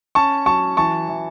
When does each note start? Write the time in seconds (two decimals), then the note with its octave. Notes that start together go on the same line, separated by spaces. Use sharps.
0.15 C#4 A5 C#6
0.46 F#3 A5 C#6
0.77 E3 A5 C#6
1.09 E3